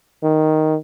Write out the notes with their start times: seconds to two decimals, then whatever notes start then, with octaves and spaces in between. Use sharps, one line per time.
0.23 D#3